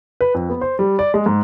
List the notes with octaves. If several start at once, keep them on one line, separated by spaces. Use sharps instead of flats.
B4
F2
B3
C5
G3
D5
G#3
G#2